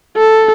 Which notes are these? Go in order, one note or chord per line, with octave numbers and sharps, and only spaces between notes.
A4